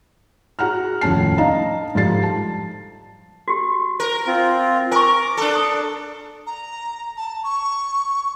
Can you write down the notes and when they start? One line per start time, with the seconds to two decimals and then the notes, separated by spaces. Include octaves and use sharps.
0.59 F#4 G#4 F#5 A#5 F6
1.01 D#1 F2 A2 C#4 A5 C7
1.38 D4 D#4 D#5 F5 A5 A#5
1.95 G#2 F3 G3 A4 A6 C7
2.23 A5
3.48 F#4 G4
4.00 A#4
4.27 C4 F4
4.92 A#4 G#5 C#6 D6
5.37 D4 A4
5.55 D#6
6.46 A#5
7.17 A5
7.43 C#6